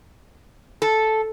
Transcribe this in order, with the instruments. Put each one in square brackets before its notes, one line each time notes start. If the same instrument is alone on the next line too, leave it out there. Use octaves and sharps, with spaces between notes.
[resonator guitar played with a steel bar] A4